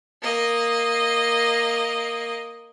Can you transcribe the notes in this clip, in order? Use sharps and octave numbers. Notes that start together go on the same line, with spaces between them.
A#3 D#5